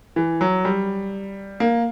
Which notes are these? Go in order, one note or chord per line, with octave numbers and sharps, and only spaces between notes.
E3
F#3
G3
A#3